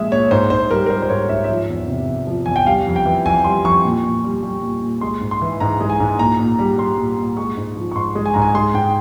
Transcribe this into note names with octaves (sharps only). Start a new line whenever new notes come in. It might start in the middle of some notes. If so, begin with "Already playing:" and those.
Already playing: A#2 F3 G#3 E5
A#2 C#5
G#2 C5
G#2 C5
G3 A#4
A#4
G3 C5
C5
G#2 C#5
G#2 E5
C#5
F3 E5
E2
C3
E2
F3
E2 G#5
G5
G3 F5
F2
G5
E3
F2 G#5
G3 C6
F2 C#6
A#2
A#2
G3
G3
A#2
A#2
G#3 C6
G#2
C6
E3
G#2 A#5
G#3
G#5
G#2
A#2 A#5
A#2
G3
G3 C6
A#2
A#2
G#3 C#6
G#2
F3
C#6
G#2 C6
G#3
G#5
G#2 A#5
G#5
G#3 C6
G#2 G5